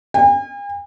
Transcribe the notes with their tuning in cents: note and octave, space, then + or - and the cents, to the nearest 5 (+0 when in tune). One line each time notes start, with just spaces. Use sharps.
G#5 -45